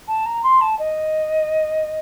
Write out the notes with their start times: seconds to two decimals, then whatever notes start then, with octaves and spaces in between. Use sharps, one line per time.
0.08 A5
0.26 A#5
0.43 C6
0.61 A5
0.79 D#5